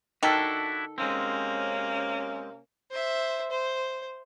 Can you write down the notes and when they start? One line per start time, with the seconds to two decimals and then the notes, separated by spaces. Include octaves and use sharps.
0.23 D#3 D4 E4 F#4 A4
0.98 C3 G#3 A#3 C4 C#4
2.91 C5 E5
3.51 C5